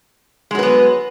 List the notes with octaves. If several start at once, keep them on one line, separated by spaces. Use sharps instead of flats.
F#3 G#3 B3 B4